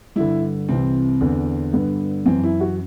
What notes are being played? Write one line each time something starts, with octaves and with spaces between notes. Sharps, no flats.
G2 D3 E4
C2 C3 E3 C4
E2 D3
G2 D3 B3
F#2 E3 C4
E4
F#4